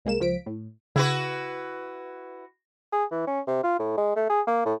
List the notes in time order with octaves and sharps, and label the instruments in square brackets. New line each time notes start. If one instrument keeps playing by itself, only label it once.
[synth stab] C2 G#3 A#3 E7
C#2 F3 B6 D7
A2
[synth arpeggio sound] C#3 [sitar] E4 F#4 B4
[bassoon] G#4
E3
C#4
C3
F4
A2
G#3
A3
G#4
A#3
A2